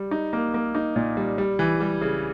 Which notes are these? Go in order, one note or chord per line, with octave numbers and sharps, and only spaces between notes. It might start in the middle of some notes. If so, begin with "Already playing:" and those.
Already playing: G3
D#4
A#3
A#3
D#4
A#2
G3
G3
E3
G3
C#3